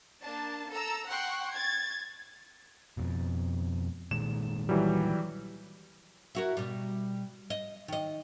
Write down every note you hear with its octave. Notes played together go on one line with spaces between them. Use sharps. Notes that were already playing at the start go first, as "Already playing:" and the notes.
A#3 D4 A5
A4 A#5 E6
F#5 G5 C6 C#6 F#6
G#6 A6
F2 B2
A#2 D#3 G#3 E7
E3 F#3 G3
E4 F#4 A#4
B2 G3
D#5
D#3 D#5